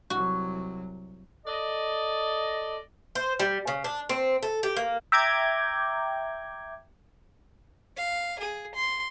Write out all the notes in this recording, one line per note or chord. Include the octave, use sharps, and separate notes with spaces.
C2 F#3 F#4
A4 D5 D#5
C5
G3
C#3
D4
C4
A4
G4
A#3
E5 G5 A#5 D6 G6 G#6
F5
G#4
C6